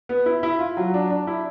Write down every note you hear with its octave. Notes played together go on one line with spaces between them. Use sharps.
B3
E4
E4
F4
F#3
D4
D4
E4